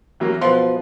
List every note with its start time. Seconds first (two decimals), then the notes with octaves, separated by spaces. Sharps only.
0.20 E2 F#3 A#3
0.41 B2 F3 B4 C6